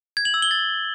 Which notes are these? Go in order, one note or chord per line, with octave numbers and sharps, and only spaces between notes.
G#6
F#7
E6
G7
A6